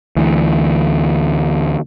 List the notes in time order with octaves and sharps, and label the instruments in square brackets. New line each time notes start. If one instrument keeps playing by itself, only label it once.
[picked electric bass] D2 E3